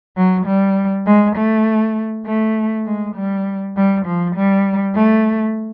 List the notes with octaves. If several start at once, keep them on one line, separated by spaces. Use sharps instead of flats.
F#3
G3
G#3
A3
A3
G#3
G3
G3
F3
G3
A3